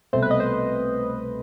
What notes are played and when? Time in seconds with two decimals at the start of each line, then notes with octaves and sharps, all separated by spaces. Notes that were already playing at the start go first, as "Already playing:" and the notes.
0.13 C2 B2 A3 C4 C5
0.22 B4
0.31 D#5
0.40 C5